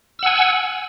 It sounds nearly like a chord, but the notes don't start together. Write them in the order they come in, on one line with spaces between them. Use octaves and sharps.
E6 F#5 G#5